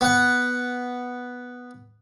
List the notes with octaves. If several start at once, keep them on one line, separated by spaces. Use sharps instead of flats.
B3 F#5